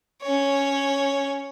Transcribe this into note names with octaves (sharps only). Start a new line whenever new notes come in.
C#4 C#5